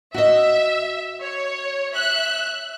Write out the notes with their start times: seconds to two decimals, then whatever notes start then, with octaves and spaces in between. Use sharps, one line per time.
0.14 F#4 D#5 E5
1.21 C#5
1.94 E5 F#6